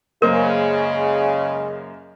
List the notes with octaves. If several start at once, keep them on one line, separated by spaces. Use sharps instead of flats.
F#2 C#3 G#3 A#3 A#4 C5